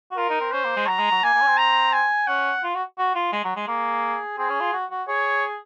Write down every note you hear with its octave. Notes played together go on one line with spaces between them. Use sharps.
F#4
F4 A#4
D#4
C4
C#4 C5
A#3
G#3
F#3 A#5
G#3
F#3
A#3 G#5
A#3
C#4
C4
A#5
G#5
C#4 F#5
F4
F#4
F#4
F4
G#3
F#3
G#3
A#3 G#4
C4 G#4
C#4
F4
F#4
F#4
G#4 C#5